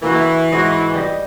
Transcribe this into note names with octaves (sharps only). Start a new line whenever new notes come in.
E3 A#3 F#4
E4 A4
G#2 F#4 D#5
G3 G4 D#5